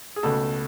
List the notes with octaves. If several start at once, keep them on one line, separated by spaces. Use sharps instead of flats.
G#4
C#2 B2 A3 A4